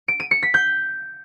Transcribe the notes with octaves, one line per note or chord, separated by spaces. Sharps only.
D7
D#7
C#7
B6
G6